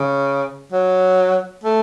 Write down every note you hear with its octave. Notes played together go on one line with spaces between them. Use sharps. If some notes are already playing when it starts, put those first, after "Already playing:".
Already playing: C#3
F#3
A3